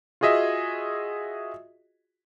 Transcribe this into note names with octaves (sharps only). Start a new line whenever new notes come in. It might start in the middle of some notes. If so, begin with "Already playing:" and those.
F4 F#4 G#4 D#5 E5